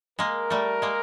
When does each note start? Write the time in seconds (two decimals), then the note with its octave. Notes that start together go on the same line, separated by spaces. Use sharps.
0.19 G#3 A#3 A#4
0.50 G3 A3
0.82 G#3 A#3